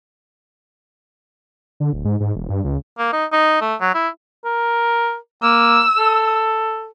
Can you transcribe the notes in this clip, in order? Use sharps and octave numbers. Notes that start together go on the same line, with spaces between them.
D3
D1
G#2
G#2
E1
G2
C#2
A#3
D#4
D#4
A3
F#3
E4
A#4
A#3 E6
A4